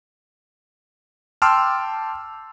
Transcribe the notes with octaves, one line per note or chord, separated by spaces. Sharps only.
G5 A5 C6 D6 E6 F6